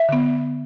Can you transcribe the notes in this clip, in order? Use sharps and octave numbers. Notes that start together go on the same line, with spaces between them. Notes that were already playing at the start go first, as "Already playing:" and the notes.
Already playing: E5
D3 B3